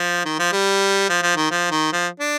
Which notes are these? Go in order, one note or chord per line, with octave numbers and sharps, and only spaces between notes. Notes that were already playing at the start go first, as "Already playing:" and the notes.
Already playing: F3
D#3
F3
G3
F3
F3
D#3
F3
D#3
F3
D4